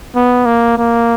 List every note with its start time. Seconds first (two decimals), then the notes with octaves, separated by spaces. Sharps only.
0.15 B3
0.46 A#3
0.78 A#3